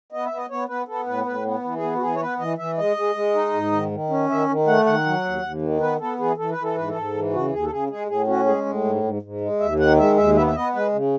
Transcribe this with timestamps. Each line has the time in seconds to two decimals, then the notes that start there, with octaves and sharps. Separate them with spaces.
0.12 B3 D#5
0.25 E5
0.32 B3
0.37 D#5
0.50 B3 C#5
0.68 B3 B4
0.88 B3 A4
1.06 A2 B4
1.26 A2 B4
1.44 B3
1.64 E3
1.76 G#4
1.83 B3
1.96 F#4
2.02 E3 G#4
2.15 C#5
2.21 B3 B4
2.39 E3 D#5
2.58 E3 E5
2.78 G#3 D#5
2.97 G#3
3.15 G#3
3.35 D#4
3.53 G#2
3.72 D#3
3.91 D#3
4.10 C#4
4.30 D#3 E5
4.49 D#3
4.67 A3 F#5
4.86 D#3 F#5
5.06 F#3
5.25 D#2
5.43 D#2
5.62 D#3
5.81 B3 B4
6.00 B3 A4
6.19 E3 G#4
6.37 E3 A4
6.51 B4
6.58 E3
6.63 A4
6.76 G#2 B4
6.89 A4
6.95 G#2
7.14 E3
7.33 C#3 F#4
7.52 D#2 G#4
7.64 A4
7.71 C#3 G#4
7.90 G#3 G#4
8.09 A2 G#4
8.27 C#4 F#4
8.46 G#3 G#4
8.66 A2
8.84 G#2
9.03 G#2
9.22 G#2
9.41 G#3
9.60 D#2 E5
9.79 D#3 F#5
9.99 G#3 E5
10.17 D#2 E5
10.36 B3 E5
10.47 E5
10.55 B3 D#5
10.74 G#3 B4
10.93 C#3